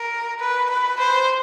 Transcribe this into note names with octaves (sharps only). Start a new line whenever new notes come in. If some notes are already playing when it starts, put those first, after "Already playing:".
Already playing: A#4
B4
B4
C5